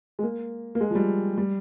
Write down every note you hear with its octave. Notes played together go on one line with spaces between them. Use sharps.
G#3
A#3
A#3
G#3
F3
G3
G3